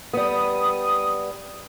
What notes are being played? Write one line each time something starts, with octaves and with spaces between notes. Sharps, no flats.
G3 B3 D#6